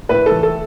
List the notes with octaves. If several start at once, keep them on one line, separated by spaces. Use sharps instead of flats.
A2 B4
A4
E3
A4